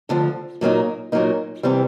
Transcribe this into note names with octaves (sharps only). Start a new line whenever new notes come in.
D2 D3 F3
A#2 F#3 A#3 D#4
A#2 F#3 A#3 D#4
C3 E3 G3 C4